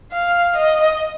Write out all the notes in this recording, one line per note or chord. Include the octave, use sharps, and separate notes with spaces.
F5
D#5